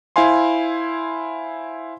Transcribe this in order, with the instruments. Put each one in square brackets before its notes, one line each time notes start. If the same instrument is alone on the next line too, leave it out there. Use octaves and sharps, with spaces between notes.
[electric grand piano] E4 C5 F5 G#5 C6